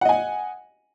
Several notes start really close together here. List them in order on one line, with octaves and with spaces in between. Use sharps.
F#5 D#5 G#5